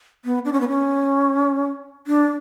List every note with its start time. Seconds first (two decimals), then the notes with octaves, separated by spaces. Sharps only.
0.25 B3
0.45 D4
0.53 C#4
0.61 B3
0.69 C#4
2.07 D4